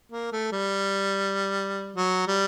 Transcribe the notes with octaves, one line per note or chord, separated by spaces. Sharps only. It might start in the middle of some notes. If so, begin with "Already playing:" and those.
A#3
A3
G3
F#3
G3